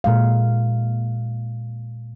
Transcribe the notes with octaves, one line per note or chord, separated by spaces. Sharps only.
A#2 G#3 F5